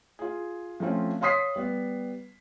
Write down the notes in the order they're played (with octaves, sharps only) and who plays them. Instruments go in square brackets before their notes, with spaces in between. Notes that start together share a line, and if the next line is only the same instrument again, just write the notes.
[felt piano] F4 G#4
F3 A3 C4 C#4 F4
C#5 F5 C6 D#6 B6 C7
G3 B3